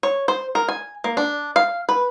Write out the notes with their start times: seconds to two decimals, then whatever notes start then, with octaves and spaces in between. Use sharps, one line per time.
0.03 C#5
0.28 C5
0.55 A#4
0.68 G#5
1.04 A#3
1.17 D4
1.56 F5
1.89 B4